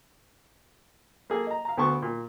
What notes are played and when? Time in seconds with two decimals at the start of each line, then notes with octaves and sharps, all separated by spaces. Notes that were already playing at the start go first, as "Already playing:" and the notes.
1.30 A#3 G#4 A4
1.47 D#5 A#5
1.65 F5 A#5
1.77 D2 B3 A4 A5 C6 C#6
2.02 A#2